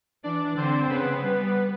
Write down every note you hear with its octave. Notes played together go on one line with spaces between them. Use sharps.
E3 D4 D5
D3 C4 C5
C#3 B3 B4
G3